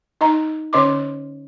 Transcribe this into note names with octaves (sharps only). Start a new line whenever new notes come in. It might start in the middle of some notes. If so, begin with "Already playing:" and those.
D#4 D#5 A#5
D3 C#4 C#5 D#5 C6 D6